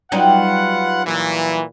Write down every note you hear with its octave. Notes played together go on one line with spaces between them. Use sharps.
F#3 G3 D#4 F4 B4 F#5
A#2 E3